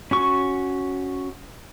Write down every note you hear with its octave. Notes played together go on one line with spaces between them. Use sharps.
C#4 F#4 C#6